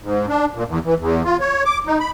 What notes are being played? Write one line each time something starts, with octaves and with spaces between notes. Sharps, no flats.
G#2
D4
A#2
E2
E3
E2
F4
C#5
D6
D#4
B5